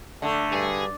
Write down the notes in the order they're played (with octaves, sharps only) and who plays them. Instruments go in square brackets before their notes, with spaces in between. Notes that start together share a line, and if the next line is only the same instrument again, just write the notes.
[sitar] D3 [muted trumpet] A3
[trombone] G2 [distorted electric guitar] G#4